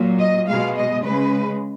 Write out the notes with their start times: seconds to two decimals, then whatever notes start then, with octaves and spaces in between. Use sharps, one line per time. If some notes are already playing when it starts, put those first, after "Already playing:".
Already playing: A#2 F#3
0.19 D#5
0.48 B2 G#3 F5
0.77 D#5
1.05 C#3 G#3 B4